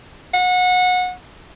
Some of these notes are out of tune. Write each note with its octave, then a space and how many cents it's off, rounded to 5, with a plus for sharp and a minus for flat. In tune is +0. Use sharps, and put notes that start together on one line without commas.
F#5 -25